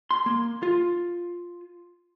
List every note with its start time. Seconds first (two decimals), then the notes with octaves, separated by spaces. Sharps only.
0.11 C6
0.26 A#3
0.63 F4